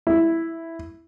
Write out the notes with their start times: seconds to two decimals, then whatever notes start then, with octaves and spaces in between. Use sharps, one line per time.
0.07 E4